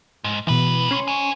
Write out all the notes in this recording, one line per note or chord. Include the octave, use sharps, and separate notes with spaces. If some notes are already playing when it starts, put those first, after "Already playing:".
G#2
C#2 B2 E3 B4
C#4 C6 C#6
C5 G#5